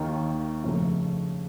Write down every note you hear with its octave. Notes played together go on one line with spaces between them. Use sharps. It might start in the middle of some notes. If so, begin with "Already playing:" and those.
Already playing: D#2 D#3 A#3
F2 C#3 A3